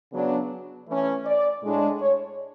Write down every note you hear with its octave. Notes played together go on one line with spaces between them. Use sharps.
C#3 F#3 B3 D4
E3 A3 C#4
D5
A2 G#3 D4
C#5